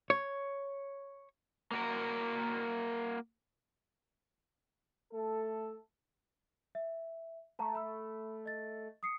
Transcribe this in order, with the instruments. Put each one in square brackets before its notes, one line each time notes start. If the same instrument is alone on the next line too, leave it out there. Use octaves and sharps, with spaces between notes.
[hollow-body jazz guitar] C#5
[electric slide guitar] A#3 F#4 A#4
[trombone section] A3 A4
[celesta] E5
[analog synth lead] A3 [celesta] A5 A#5
[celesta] B5 E6
D#5 A6
D#6 C7 C#7